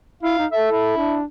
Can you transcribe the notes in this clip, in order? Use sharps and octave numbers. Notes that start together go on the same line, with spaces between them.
E4 F5
D#4
A4 E5
E4
D4